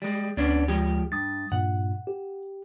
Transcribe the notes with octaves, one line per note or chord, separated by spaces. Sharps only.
G3 G#3
D2 B3 C#4 D4
F3 G#3 G4
G2 D#6 A6
G2 A#2 F#5
G4